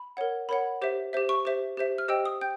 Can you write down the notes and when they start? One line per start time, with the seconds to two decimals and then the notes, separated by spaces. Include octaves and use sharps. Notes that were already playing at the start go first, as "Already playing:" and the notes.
Already playing: B5
0.17 A#4 C#5 F#5
0.49 A#4 C#5 F#5 B5
0.82 G4 C5 E5
1.13 G4 C5 E5
1.29 C#6
1.45 G4 C5 E5
1.77 G4 C5 E5
1.98 F6
2.08 G4 C5 D#5 G5 E6
2.25 D#6
2.41 G5 G6